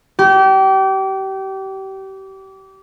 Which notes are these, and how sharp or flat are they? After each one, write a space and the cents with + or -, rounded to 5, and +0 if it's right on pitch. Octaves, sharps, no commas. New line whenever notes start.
G4 -30